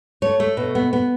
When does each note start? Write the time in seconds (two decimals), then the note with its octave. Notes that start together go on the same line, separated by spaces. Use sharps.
0.22 A3 C#5
0.40 A3
0.57 B2
0.75 B3
0.93 B3